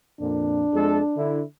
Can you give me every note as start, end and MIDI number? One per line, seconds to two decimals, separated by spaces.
0.21 0.66 41
0.21 0.66 46
0.21 1.40 62
0.74 1.00 41
0.74 1.00 56
0.74 1.00 69
1.17 1.42 50
1.17 1.42 64